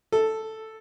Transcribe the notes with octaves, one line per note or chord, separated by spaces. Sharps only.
A4